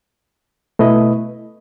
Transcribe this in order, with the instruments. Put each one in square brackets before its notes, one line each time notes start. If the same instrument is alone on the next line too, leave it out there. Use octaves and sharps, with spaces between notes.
[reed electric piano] B2 A3 E4 B4 D#5